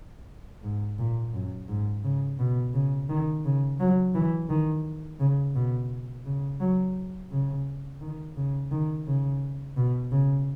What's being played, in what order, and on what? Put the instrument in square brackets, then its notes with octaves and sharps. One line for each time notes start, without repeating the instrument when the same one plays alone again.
[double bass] G#2
A#2
F#2
G#2
C#3
B2
C#3
D#3
C#3
F#3
E3
D#3
C#3
B2
C#3
F#3
C#3
D#3
C#3
D#3
C#3
B2
C#3